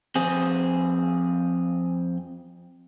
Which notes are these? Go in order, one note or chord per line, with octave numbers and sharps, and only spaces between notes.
F2 C4 G#4